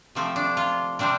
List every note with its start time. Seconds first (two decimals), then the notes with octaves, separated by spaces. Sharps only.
0.15 C3 F3 A3 C4
0.36 D4
0.57 F4
0.99 C3 G3 C4 D4